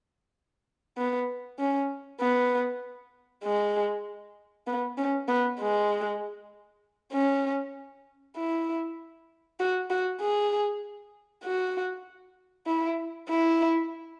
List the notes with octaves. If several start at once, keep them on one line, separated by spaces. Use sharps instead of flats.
B3
C#4
B3
G#3
B3
C#4
B3
G#3
C#4
E4
F#4
F#4
G#4
F#4
E4
E4